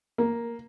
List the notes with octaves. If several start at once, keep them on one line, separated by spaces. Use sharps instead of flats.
A#3